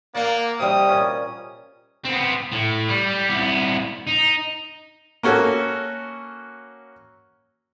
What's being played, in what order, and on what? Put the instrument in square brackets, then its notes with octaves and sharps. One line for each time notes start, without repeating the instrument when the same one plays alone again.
[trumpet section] A#3 [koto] D5 F#5
[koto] C3 G3 [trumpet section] F#4 D#5 D#6
[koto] A#2 C#4
[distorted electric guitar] B3 C4
A2
G3
C2 B3
D#4
[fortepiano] A#3 C#4 F#4 A4